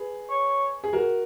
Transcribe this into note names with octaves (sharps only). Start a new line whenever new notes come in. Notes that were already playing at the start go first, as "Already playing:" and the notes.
Already playing: G#4 B4
C#5
G#4
F#4 A#4